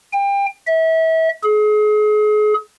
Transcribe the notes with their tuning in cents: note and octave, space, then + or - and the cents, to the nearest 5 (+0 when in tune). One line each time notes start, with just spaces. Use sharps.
G5 +30
E5 -30
G#4 +35